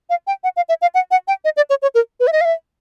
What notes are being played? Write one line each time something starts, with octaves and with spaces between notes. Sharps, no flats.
F5
G5
F#5
F5
E5
F5
F#5
F#5
G5
D#5
D5
C#5
C#5
A#4
B4
E5
D#5
F5
E5